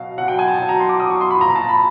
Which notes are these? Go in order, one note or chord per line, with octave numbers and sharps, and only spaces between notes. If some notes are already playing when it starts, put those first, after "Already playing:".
Already playing: B2 F#3 F5
B2 F#3 F#5
G5
G#5
A5
B2 F#3 A5
A#5
C6
D6
B2 F#3 D#6
C#6
C6
B5
A#2 F3 A#5
A5
B5